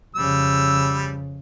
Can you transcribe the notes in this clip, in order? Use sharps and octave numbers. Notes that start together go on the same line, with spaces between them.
F2 C#3 G3 E6